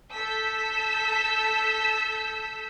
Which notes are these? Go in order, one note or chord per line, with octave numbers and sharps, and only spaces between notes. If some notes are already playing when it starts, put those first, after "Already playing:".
A4 E6 G6 B6